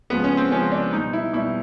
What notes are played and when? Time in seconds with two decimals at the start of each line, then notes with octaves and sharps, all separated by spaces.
0.10 C#3 F3 G#3 B3
0.24 C#4
0.37 C4
0.51 C#3 F3 G#3 C#4
0.72 D4
0.93 B2 G3 D#4
1.13 E4
1.33 B2 G3 E4